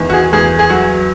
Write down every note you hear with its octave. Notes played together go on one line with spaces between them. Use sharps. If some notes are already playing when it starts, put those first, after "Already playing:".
Already playing: E2 D#3
F#4
G#4
E2 G#4
G#4
F#3 F#4